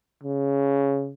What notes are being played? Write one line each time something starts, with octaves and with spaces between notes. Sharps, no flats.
C#3